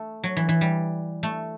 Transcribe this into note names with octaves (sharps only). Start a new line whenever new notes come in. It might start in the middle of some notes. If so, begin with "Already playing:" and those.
Already playing: A3
F#3
E3
E3
G3
A3